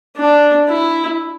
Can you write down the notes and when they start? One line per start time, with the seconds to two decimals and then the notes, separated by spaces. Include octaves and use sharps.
0.17 D4
0.69 E4